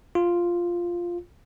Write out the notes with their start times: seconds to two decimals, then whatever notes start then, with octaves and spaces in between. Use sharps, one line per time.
0.15 F4